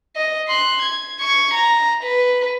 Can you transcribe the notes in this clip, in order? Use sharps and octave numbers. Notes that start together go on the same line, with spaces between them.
D#5
C6 F#6
G#6
C#6 G#6
A#5
B4